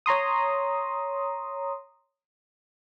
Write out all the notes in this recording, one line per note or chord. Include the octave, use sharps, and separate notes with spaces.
C#5 A#5 C6 D#6